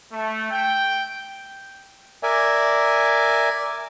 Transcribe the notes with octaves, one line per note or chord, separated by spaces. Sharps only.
A3
G5
A#4 D5 E5 G#5